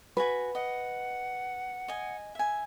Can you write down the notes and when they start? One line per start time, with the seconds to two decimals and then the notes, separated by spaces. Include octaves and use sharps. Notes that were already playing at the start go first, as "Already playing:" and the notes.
0.17 F#4 B4 G#5 B5
0.55 D#5 F#5
1.88 D#5 G#5
2.35 E5 G#5